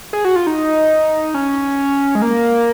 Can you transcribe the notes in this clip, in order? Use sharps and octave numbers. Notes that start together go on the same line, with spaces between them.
G#4
F#4
F4
D#4
C#4
G#3
A#3